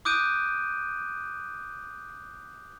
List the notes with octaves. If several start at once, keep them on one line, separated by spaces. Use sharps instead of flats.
D6 D#6 F#6 G6 D7 D#7